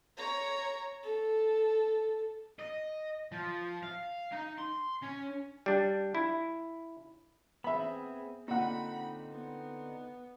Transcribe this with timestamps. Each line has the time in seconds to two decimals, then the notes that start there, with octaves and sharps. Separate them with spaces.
0.17 C#5 A#5
1.03 A4
2.59 D#5
3.32 F3
3.83 F5
4.32 D#4
4.58 C6
5.03 C#4
5.66 G3 D4
6.15 E4
7.64 B3 C4 G#4 E5 B5
8.48 A#2 D3 C4 D#4 F#5 B5
9.32 B3